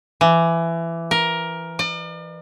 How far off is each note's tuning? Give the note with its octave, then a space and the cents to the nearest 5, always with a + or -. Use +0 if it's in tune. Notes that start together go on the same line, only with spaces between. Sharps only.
E3 +20
A#4 +15
D5 +45